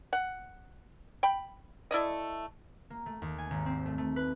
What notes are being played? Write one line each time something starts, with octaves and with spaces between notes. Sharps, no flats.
F#5
G5 B5
A3 E4 D5 D#5
A#3
A3
D#2
G#5
G#1
C4
A3
A3
B4